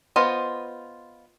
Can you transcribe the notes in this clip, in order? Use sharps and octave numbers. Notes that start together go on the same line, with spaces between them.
B3 F4 C5 D#5